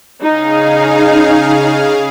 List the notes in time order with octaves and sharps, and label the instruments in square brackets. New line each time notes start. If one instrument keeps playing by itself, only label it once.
[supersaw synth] C#3 G#4 F5 [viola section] D#4